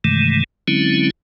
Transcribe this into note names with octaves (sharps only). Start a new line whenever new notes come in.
G2 C3 D#3 E3 G#3 A3
D3 F#3 G#3 C4 C#4 E4